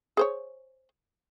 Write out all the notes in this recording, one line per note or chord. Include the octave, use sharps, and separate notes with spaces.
G#4 C5 C#5